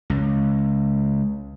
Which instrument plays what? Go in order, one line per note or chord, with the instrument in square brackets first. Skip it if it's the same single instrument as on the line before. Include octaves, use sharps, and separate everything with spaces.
[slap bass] C#2